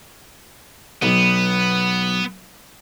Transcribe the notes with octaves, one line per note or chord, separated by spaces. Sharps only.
B1 B3